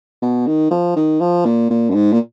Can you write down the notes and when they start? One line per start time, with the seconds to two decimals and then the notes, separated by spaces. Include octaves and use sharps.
0.22 B2
0.47 D#3
0.71 F3
0.96 D#3
1.21 F3
1.45 A#2
1.70 A#2
1.90 F#2
1.94 G#2
2.13 A#2